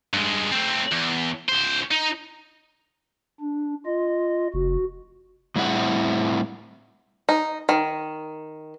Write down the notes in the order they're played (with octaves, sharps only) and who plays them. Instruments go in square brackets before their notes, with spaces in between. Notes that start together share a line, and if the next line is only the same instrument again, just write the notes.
[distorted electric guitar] G2 G#3
A3 C4
E2
C#2 C5
D#4
[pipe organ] D4
F4 D#5
[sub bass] F1 [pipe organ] F#4
[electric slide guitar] A2 G3 C4 E4 E5 F#5
[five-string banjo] D#4
D#3